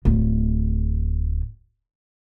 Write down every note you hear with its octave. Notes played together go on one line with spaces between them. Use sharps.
D1 A3